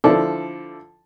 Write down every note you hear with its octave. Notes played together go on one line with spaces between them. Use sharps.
D3 F3 E4 A4 D5